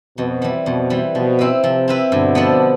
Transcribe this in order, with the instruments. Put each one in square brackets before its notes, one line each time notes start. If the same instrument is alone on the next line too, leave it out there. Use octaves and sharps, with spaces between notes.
[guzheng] F2 [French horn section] B2
[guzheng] E3 G3
[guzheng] F2 [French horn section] B2
[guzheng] E3 G3
[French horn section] B2 [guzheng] F3
[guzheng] C4 E4 B4
[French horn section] C3 [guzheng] F3
[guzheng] C4 E4 B4
[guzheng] G2 [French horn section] B2 D3
[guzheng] F3 B3 D4 A4